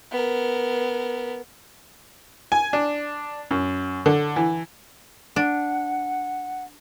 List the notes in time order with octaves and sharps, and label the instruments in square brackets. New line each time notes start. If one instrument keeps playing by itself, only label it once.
[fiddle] B3 A#4
[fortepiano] G#5
D4
F#2
D3
E3
[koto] D4 [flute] F#5